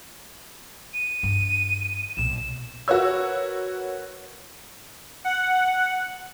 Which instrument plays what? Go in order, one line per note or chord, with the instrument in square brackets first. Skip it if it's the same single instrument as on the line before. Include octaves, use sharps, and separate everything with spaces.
[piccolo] D#7
[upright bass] G2 D4
[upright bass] B1 A#2 [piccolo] E7
[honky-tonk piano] F#4 A#4 B4 C#5 E6
[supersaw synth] F#5